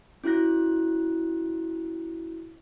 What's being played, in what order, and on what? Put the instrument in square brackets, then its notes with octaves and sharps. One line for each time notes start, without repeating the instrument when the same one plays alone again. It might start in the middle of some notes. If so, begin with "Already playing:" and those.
[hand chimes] C#4 E4 F#4 F#6 A#6